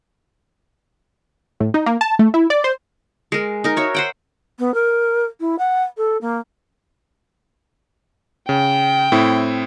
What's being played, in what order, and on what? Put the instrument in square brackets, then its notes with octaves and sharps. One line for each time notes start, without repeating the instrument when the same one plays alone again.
[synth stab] A2
D#4
A#3
A5
A3
E4
D5
C5
[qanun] G#3 A#4
D#4 A#4
F#4 C#5 E5
C5 F#5 G5
[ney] B3
A#4
E4
F#5
A4
A#3
[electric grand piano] C#3 [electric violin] G5
[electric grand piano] A2 C4 E4